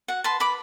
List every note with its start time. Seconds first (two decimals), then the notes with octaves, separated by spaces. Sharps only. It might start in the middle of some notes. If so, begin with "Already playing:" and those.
0.08 F#4 F#5
0.24 B4 A5 C6
0.40 B4 B5 D6